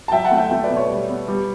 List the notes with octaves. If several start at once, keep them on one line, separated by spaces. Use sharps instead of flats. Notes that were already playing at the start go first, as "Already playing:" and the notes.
A5
F#3 E5 G5
F#5 A5
A3
E5 G5
A3
B4 D5
B2
C#5
G3
B3
G3